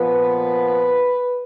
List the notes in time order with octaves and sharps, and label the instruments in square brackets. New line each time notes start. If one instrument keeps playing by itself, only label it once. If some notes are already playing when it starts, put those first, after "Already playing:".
Already playing: [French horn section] A#2 F3 B3 B4